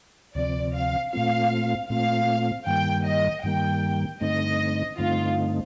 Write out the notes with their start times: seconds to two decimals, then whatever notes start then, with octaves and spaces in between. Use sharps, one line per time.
0.35 D2 C3 F3 C4 D5
0.74 F5
1.13 A#2 A3 C4 F4 F5
1.89 A#2 A3 C4 F4 F5
2.67 G2 D#3 G3 A#3 G5
3.05 D#5
3.44 G2 D#3 G3 A#3 G5
4.21 G2 D3 A3 C4 D#4 D#5
4.98 G2 D3 A3 C4 D#4 F4